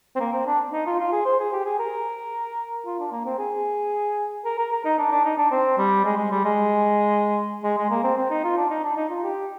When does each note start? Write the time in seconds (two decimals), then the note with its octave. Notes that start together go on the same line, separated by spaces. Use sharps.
0.16 C4
0.20 A#3
0.33 C4
0.47 D4
0.73 D#4
0.86 F4
0.99 F4
1.12 G#4
1.25 C5
1.39 G#4
1.53 G4
1.65 G#4
1.79 A#4
2.86 F4
2.99 D4
3.12 A#3
3.25 C4
3.39 G#4
4.45 A#4
4.58 A#4
4.72 A#4
4.85 D#4
4.98 D4
5.12 D4
5.25 D#4
5.38 D4
5.51 C4
5.78 G3
6.05 G#3
6.17 G#3
6.31 G3
6.45 G#3
7.63 G#3
7.77 G#3
7.90 A#3
8.03 C4
8.18 C4
8.30 D#4
8.44 F4
8.57 D4
8.70 D#4
8.84 D4
8.97 D#4
9.10 F4
9.23 G4